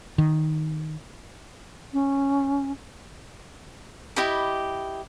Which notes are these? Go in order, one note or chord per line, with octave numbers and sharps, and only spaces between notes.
D#3
C#4
E4 G4 D#5 B5